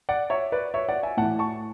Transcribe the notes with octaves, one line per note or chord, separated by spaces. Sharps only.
D5 F#5
C#5 E5
B4 D5
C#5 E5
D5 F#5
E5 G#5
A2 E3 F#5 A5
A5 C#6